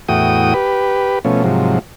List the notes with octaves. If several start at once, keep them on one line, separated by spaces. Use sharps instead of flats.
E2 A2 F#4 G5 D#6
G4 B4
B2 F3 A3 C#4
G#2 C3 F3 F#3